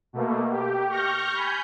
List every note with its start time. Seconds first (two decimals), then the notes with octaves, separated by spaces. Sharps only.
0.13 B2 A3 A#3
0.51 G4
0.90 C#6 F6 G6 A#6
1.32 G#5 B5 G6